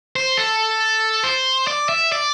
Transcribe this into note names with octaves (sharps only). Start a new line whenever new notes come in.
C5
A4
C5
D5
E5
D5